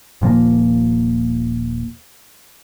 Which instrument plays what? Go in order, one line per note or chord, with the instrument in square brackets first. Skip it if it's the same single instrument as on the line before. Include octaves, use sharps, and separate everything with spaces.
[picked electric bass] D#1 A#2 F3 A#3